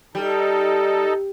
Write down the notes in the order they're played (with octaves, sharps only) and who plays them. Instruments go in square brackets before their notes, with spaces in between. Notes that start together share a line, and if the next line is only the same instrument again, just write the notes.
[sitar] G3 [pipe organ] D#4 A4